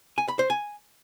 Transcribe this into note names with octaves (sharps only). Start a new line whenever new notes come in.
G#5
B5
C5
G#5